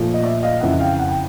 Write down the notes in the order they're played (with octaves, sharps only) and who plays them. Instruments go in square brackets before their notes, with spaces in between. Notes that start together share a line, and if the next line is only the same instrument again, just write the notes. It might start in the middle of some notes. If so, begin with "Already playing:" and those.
Already playing: [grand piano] A#2 F3 A3
D#5
D5 E5
D#5 F5
F2 C#3 E3 E5 F#5
F5 G5
F#5
G5